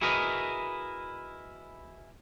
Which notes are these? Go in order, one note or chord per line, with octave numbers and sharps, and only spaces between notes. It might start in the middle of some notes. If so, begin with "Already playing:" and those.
E4 F#4 G#4 A#4 B4 D#5